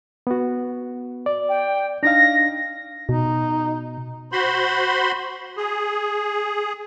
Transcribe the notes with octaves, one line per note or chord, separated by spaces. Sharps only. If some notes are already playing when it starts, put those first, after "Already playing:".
B3 F#4
D5
G5
D4 D#4 F5 A#6
B2 D#4
F#4 C5 B5 C6
G#4